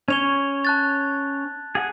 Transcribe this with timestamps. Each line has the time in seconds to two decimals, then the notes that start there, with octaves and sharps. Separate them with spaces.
0.08 C#4 C#5 G#6 F7 G7
0.65 A5 F#6 A6
1.75 G#4 F#5 G#5